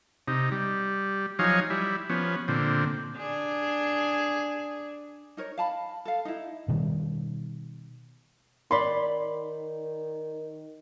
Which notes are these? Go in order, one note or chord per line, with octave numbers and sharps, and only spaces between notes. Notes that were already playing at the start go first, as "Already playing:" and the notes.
C3 D#4
G3
F3 F#3 D#4 C#5 F5 G#5
G3 E4
F3 B3 C#4
A#2 D3 C4
D4 G#4
D#4 A#4 C#5
F5 A5 B5
A4 F5
D#4 E4
B2 D#3 G3
D#3 C#5 D5 B5 C6